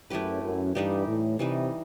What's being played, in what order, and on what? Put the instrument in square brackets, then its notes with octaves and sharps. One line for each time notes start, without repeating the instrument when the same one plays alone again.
[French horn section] F#2 [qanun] A3 E4 G4 B4
[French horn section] F#2
[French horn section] G2 [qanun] E3 G3 D#4 G4
[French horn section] A2
[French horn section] C3 [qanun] E3 G3 D#4